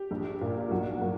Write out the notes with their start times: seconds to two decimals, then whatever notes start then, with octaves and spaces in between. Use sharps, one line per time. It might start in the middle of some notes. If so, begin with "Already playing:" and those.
Already playing: G4
0.11 A#1
0.41 A#2 A#3
0.71 B1 F#4
1.01 A#2 F#3 A#3